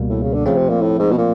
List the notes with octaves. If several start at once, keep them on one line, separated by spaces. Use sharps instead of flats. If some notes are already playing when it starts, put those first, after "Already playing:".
Already playing: C#2 B2 G3 A#3
A2
C#3
D3
C#3 F3 A3 C4
C3
A#2
A2
G#2
B2
A#2